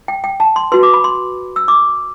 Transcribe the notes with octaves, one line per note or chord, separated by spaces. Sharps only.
G5
G5
A5
C6
F#4 B4 C6
D6
B5
C6
E6
D6